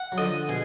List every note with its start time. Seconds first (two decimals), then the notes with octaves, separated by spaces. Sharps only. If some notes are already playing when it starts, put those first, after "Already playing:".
Already playing: F#5
0.12 F#3
0.17 D3 F3 D#5
0.48 B2 G#4